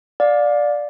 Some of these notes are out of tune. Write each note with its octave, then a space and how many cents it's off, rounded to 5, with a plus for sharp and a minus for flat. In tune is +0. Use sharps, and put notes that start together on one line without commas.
D5 +0 F5 +30